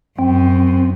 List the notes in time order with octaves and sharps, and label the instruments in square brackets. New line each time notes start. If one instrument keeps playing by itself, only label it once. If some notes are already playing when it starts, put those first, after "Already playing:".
[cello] F#2 [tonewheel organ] C4